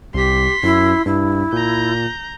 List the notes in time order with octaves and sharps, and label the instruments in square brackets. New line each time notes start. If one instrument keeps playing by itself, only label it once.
[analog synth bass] C2 [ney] G4 [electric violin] C6 B6
[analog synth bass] F#2 [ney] E4
[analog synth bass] G2 [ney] E4
[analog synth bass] A#2 [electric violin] A#5 G6